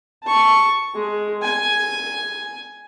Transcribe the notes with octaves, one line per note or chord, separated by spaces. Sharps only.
A5 C#6
G#3
G#5